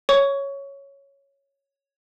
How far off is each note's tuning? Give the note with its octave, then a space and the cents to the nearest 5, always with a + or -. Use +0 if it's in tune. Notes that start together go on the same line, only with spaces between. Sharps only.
C#5 +0 C#6 +20